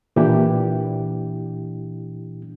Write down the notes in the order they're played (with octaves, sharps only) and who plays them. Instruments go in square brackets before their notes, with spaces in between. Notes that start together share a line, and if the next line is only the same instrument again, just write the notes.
[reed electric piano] A#2 E3 D4 E4 G4